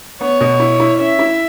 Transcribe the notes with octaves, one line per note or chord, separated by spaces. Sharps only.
B3 C#5
B2
E4
E4
C#4 E5
E4